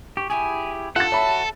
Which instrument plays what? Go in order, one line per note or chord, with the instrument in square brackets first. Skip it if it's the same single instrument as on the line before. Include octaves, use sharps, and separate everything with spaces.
[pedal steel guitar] G4 [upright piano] C#6
[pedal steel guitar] E4 G4 G#4 [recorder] G#5
[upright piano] F4 A6 [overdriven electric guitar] A4 [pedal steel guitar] F#5 [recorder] A5
[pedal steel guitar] F#4 [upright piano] C#5 E5 B5